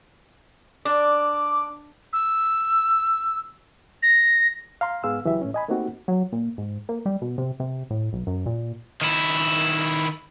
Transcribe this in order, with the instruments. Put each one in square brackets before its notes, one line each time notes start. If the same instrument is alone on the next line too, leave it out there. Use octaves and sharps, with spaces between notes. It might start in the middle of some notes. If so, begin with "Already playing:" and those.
[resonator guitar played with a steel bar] D4 [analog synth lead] D6
[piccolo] E6
A#6
[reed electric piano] F5 A#5 C6
G#2 B3 G#4 F5 E6
C#2 E3 F#3 G4 E5
A2 C#4
D#5 G#5 B5
A3 A#3 C4 D#4 F#4 G4
[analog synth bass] F#3
A#2
G#2
A#3
G3
B2
C3
C3
A2
B1
F#2
A#2
[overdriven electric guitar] D#3 E4